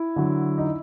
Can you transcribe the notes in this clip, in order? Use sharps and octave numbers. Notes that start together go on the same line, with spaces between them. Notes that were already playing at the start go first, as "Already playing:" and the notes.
Already playing: E4
D3 F#3
D#4